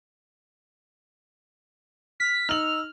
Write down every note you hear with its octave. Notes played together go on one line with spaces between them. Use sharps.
F6 B6
D#4 E6 F6 F#7